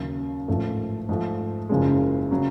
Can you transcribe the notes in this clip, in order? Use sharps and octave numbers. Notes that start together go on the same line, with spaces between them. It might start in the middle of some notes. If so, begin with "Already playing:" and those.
Already playing: D#2 C#3 F#3
A1 G#2 F3 A3
G#2 F3 A3
F#1 F#2 C#3 F3 G#3
C#3 F#3